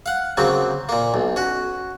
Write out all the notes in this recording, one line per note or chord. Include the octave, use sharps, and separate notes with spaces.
F5 F#5
C#3 F#3 A#3 C4
A#2 A#3
B1
C#4 F#4